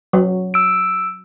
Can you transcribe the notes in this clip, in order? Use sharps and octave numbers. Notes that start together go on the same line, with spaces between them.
F#3
E6 D7